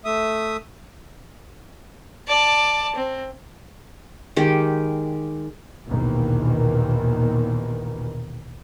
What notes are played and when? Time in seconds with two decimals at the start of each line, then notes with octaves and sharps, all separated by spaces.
0.05 A3 E5 D#6
2.28 D5 A5
2.95 C4
4.36 D#3 G#3 G4
5.86 A#1 D#2 B2 D#3 E3 A#3